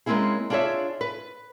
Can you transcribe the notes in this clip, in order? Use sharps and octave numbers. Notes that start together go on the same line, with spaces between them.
G#3 A#3 C4 C#4 E4 G#4
D4 F4 G#4 C5 C#5 E5
B4